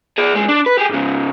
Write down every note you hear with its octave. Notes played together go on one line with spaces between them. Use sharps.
G#4 D5
B1 G#3
D4
B4
G4 G#4
G#2 C#3